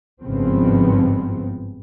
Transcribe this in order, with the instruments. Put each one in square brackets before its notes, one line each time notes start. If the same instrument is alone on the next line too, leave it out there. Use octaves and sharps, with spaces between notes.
[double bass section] G#1 G2 C#3 F3 B3 C4